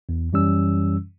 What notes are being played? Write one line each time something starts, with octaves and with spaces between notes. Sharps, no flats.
E2
F#2 E3 G3 C#4 E6